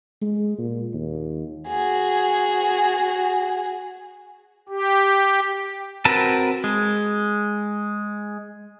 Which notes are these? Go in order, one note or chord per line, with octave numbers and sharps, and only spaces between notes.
G#3
A#2
D#2
F#4 G#4
G4
C4 F#4 A#4 B4 A5
G#3